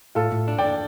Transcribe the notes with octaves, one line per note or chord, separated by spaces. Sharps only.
A2 F4 A4
A2
D4
D5 G5
D4